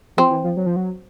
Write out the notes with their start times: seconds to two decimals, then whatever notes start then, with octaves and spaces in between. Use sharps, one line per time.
0.17 F3 C4
0.31 E3
0.44 F3
0.57 F#3
0.66 F3
0.76 F#3